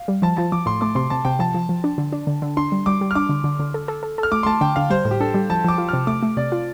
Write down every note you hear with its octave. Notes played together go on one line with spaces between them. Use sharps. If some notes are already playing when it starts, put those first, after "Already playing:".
Already playing: F5
G3
F3 A5
F3 A5
F3 D6
A2 C6
A3 D6
C3 C6
C3 A5
C3 G5
F3 A5
F3
F3
D4
D3
D4
D3
D3
D4 C6
G3
G3 D6
G3
F6
D4 D6
D3
D3
D3
A4
A4
A4
A4
F6
A3 D6
C6
A3 A5
D3 G5
D3 F5
G3 C5
A2
G4
D4 A4
G3
F3 A5
F3 D6
F4
C3 F6
A3 D6
A3
C3 D5
F4